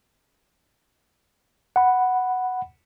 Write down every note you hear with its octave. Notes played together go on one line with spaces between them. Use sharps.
F#5 B5